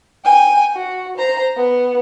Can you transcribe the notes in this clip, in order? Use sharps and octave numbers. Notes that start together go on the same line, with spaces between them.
G5 G#5
F#4
C5 A#5
B3